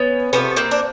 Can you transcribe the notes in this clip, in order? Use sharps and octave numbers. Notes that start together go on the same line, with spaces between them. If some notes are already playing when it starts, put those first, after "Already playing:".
Already playing: B3 C#4
C3 F3 A3 B3 C#4
A#3 C4
D4